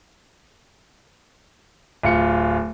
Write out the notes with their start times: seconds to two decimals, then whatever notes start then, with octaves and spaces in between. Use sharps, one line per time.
2.03 D1 F4 C#7